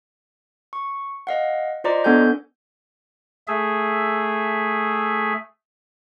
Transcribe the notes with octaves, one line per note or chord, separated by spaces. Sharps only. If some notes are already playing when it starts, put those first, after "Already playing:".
C#6
D#5 F5 F#5
F4 C5 D5 D#5 A#5 D6
B3 D4 A4 F#5 G#5 G6
A3 G#4 E5